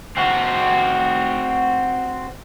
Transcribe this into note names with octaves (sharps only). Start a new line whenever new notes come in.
C4 F#4